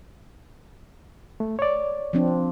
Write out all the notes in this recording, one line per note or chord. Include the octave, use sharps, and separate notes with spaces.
A3
C#5 D5
F3 C4 D4